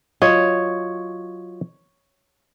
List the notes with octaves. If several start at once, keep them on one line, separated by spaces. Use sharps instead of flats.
F#3 F4 C#5 D#5